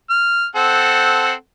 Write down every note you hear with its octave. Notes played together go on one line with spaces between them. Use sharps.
F6
C4 A4 F#5